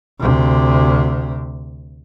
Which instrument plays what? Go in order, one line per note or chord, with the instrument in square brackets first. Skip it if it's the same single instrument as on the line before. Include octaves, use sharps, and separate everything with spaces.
[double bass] D2 C3